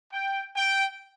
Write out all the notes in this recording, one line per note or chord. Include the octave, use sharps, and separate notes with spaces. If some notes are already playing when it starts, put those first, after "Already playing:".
G5
G5